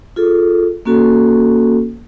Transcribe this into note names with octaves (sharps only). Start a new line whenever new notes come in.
F4 G#4 A4
A#3 C#4 F#4 A4